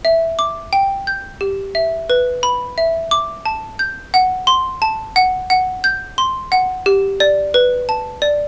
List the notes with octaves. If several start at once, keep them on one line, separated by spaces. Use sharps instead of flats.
E5
D6
G5
G6
G4
E5
B4
B5
E5
D6
A5
G6
F#5
C6
A5
F#5
F#5
G6
C6
F#5
G4
D5
B4
A5
D5